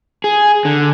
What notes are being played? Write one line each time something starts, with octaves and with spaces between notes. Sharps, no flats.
G#4
D3